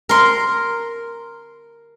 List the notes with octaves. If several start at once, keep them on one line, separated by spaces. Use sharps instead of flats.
A#4 C6